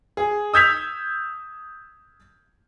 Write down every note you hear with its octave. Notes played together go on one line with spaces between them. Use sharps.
G#4
D#6 E6 G6 G#6 B6 F7